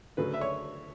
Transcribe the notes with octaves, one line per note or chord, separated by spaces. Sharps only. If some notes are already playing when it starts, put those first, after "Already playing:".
D2 C#3 F#3 A3 B4
E5
C#5